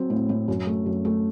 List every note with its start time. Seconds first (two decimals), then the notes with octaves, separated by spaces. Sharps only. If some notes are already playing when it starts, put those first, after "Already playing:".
Already playing: F#3 C4
0.10 A2
0.29 A2
0.48 F#2
0.67 A3
0.86 F#2
1.05 A3